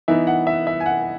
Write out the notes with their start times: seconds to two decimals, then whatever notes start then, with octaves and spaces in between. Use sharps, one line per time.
0.08 E3 B3 D#4 E5
0.27 F#5
0.47 E5
0.67 E5
0.80 G#5
0.86 F#5